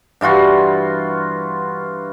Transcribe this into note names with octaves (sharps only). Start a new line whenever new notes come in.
G2 E3 F4 F#4